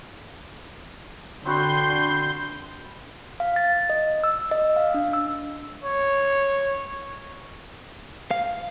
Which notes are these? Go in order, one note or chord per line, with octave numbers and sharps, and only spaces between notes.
D3 C4 F#4 B4 C6 G6
F5
A6
D#5
E6
D#5
F5
D4
E6
C#5
F5